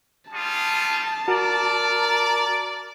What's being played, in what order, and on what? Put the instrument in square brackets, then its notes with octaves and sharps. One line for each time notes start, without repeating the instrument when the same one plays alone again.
[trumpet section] G3 F4 G#4 [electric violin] A5
[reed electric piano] F#4 [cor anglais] A#4 [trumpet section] D5